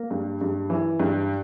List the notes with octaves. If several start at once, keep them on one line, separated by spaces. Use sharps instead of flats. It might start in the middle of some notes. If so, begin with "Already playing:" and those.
Already playing: A#3
G2
G2
E3
G2